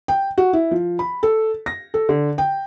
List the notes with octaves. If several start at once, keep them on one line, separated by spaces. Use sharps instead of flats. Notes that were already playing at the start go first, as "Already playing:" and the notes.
G5
F#4
E4
F3
B5
A4
A#6
A4
D3
G5